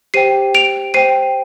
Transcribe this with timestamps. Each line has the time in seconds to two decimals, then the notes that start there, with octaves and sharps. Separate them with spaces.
0.14 G4 C5 G5 C7 D#7
0.54 D7 F7
0.94 C5 G5 C7 D#7